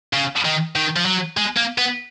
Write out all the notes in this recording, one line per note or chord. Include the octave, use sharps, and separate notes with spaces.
C#3
D#3
D#3
F3
F#3
G#3
A#3
B3